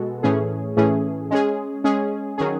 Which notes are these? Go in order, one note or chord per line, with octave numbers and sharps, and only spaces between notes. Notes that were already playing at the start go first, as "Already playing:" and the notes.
Already playing: B2 G#3 B3 F#4 A4
A2 E3 A3 C#4 G#4
A2 E3 A3 C#4 G#4
G#3 C#4 G#4
G#3 C#4 G#4
D#3 F#3 C#4 G#4